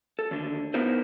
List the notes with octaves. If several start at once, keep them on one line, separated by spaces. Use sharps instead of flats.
A4
D#2 D3
B3 D#4 E4 A#4 C5